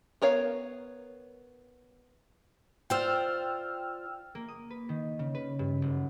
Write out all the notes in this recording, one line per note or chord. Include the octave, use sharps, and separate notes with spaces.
B3 A#4 C#5 F5
F4 C5 D5 G5 E6 F6
A#3
D#6
B4
D#3
C#3
B4
G2
F#1